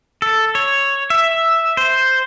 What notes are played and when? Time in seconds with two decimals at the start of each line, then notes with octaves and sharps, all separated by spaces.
0.22 A4
0.55 C#5
1.10 E5
1.77 C5